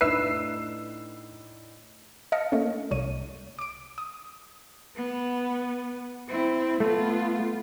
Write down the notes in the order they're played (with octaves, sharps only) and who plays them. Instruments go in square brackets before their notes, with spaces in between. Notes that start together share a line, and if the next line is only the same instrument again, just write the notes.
[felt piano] A2 D4 D#4 [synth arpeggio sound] B4 E5 [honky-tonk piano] E6 C7
[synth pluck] D#5 F5 A5 F6 A#6 C#7
A3 A#3 C#4
C2 C#5 D#7
D6 D7
D#6
[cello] B3
C4 E4
[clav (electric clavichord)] A3 [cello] B3 F4